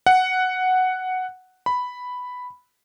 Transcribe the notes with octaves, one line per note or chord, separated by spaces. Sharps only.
F#5
B5